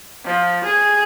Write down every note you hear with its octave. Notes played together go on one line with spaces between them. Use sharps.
F3
G#4